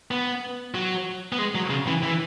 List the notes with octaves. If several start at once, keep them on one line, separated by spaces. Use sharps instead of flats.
B3
F#3
B3
G#3
F#3
C#3
E3
E3